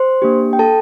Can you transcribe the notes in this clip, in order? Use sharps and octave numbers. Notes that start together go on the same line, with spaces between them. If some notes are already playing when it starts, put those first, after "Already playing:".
Already playing: C5 C6
A#3 D4 G4
G5
A4 A5